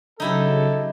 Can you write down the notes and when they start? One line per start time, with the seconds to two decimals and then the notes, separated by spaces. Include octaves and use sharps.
0.20 C#3 F#3 D#4 E4 G4 A4